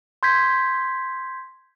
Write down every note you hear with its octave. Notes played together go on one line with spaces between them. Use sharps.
C6 G6 G#6 B6